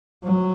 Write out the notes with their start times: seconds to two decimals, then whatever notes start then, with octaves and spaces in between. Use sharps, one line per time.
0.24 F#3